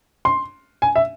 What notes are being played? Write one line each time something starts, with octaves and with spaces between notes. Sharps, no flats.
C6
G#5
E5